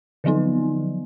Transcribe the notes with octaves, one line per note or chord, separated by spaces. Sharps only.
D3 F3 F#3 B3 D#4